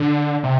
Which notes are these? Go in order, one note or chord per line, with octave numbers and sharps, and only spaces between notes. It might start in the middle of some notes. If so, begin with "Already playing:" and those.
Already playing: D3
C3